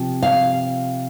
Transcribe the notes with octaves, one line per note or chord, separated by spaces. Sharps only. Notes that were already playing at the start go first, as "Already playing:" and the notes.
Already playing: C3 F3
F5